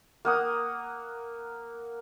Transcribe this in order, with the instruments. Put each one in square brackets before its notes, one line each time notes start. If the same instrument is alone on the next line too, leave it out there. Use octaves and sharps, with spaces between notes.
[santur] A#3 F#5 D#6